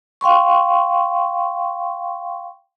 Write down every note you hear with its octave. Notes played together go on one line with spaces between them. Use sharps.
F5 G5 C6 C#6